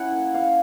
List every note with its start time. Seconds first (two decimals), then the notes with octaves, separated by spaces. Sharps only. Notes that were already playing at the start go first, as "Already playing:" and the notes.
Already playing: C#4 E4 F#5
0.12 A#3
0.33 C#4 F5